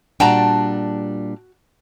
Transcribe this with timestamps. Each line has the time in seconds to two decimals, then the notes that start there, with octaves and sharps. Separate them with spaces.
0.20 A#2 G3 D4 F#4 G5 A5 A#5